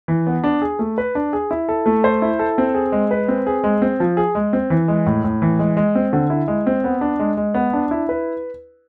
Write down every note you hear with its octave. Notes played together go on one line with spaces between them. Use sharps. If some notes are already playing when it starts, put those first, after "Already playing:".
E3
B3
D4
G#4
A3
B4
D4
G#4
E4
A4
A3
C5
E4
A4
C4
G#4
G#3
B4
C4
G#4
G#3
C4
F3
G#4
G#3
C4
E3
G#3
A2
A2
E3
G#3
G#3
C4
D3
E4
G#3
C4
B3
D4
G#3
G#3
B3
D4
E4
B4